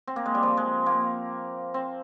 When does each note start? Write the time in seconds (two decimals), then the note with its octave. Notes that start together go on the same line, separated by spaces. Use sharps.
0.07 C4
0.16 A#3
0.26 G#3
0.35 G3
0.43 F3
0.57 G#3
0.86 A#3
1.74 C4